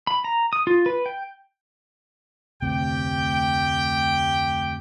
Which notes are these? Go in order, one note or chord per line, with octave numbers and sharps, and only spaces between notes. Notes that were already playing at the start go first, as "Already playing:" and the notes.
B5
A#5
D#6
F4
B4
G5
F1 D2 C3 G4 G5